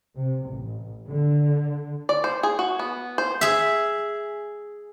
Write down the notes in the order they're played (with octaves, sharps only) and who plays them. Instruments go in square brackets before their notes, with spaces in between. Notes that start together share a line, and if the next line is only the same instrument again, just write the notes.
[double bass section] C3
A1
D3
[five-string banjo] D5
C5
G#4
F#4
B3
C5
[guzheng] G#4 E5